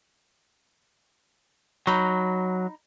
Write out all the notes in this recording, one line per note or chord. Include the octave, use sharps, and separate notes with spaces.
F#3 D#4 B5